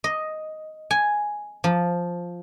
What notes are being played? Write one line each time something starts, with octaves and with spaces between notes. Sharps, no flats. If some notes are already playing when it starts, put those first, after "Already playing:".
D#5
G#5
F3